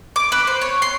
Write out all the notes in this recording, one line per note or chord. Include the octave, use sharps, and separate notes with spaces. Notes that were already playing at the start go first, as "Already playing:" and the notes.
D6
B4
C5
C#5
C6